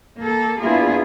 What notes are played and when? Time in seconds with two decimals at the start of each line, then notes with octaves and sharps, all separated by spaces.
0.20 A#3 A4
0.61 A#3 B3 D4 E4 F4 G#4